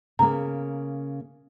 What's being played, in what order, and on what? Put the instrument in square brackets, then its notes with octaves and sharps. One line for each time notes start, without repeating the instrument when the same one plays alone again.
[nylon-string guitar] C#3 A#3 [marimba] A#5